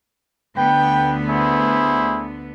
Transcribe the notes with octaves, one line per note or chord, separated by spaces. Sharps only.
D2 D3 B3 B4 G5
E4 G#4 C5